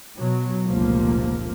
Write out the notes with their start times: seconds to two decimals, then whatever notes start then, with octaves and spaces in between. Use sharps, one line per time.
0.18 B2 F#3
0.66 F1 C#2 A#2 F3 A#3